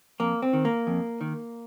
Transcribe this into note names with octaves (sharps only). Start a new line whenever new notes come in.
F2 A#3
C4
D#3
A#3
F2
D#3